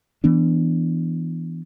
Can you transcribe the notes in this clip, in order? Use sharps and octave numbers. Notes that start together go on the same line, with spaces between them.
E3 B3 D4